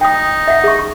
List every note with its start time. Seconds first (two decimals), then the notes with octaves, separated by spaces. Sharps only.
0.01 D#4 G5 D#6
0.48 E5 F#5
0.64 G#4 C#6
0.79 C#6